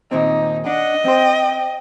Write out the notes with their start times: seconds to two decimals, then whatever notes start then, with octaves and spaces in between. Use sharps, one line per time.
0.11 D#2 A#2 C4 D#4
0.66 D4 D#5 F#5
1.05 C4 C5 G5